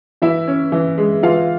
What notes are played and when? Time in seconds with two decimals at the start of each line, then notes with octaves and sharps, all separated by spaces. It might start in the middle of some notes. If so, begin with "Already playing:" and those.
0.22 E3 E4 E5
0.48 C#4
0.72 E3
0.98 G#3
1.23 E3 F4 F5